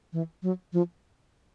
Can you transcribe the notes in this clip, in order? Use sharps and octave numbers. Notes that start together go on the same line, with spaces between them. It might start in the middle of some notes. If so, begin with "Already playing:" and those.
E3
F#3
F3